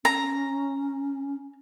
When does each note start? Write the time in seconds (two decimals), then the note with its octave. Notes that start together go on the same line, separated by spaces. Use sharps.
0.05 C#4 A#5